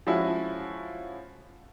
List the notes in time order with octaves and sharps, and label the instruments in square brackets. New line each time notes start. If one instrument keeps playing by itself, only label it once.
[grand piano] F3 G#3 C#4 E4 F#4